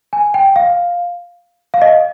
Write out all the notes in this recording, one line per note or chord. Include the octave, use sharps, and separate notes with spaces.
G#5
G5
F5
F5
D#5